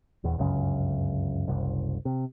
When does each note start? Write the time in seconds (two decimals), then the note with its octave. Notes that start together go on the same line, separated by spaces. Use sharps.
0.24 D#1 E2
0.38 G1 C#2 F#2 C#3
1.48 F#1 C2
2.05 C3